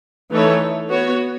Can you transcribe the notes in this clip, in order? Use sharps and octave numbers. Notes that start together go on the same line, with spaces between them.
E3 A3 D#4 A4 C#5
B3 F#4 C#5